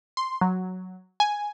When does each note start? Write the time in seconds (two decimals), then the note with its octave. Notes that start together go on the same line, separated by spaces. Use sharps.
0.17 C6
0.41 F#3
1.20 G#5